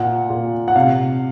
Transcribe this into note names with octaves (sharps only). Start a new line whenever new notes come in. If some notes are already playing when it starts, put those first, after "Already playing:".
Already playing: A#2 F#5
A#2
F#5
C3 F5